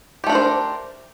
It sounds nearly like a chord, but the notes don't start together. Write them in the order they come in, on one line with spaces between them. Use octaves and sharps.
G4 A3 D4 A#4 C5